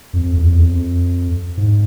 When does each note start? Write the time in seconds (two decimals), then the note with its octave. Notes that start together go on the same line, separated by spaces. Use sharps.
0.13 F2
0.37 E2
0.45 F2
0.52 E2
0.61 F2
1.57 G#2